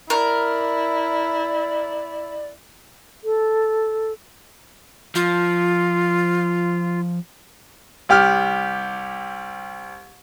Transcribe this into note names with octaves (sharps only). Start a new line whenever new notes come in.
E4 A#4 D5
A4
F3 F4
C2 G4 F6